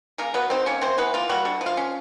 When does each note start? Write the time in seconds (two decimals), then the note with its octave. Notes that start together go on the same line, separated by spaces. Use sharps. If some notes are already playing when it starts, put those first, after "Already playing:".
0.18 C#3 A#3 A#4
0.34 F#3 B3 B4
0.50 C4 D#4 C5
0.66 A#3 C#4 C#5
0.81 C3 C4 C5
0.98 E3 B3 B4
1.14 A#3 F4
1.29 F#3 G3 F#4
1.45 D3
1.61 F3
1.66 F4 F5
1.77 C#4